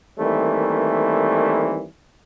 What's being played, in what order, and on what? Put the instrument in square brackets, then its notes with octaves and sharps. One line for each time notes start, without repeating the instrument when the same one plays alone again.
[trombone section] D#3 E3 G3 A3 A#3 C4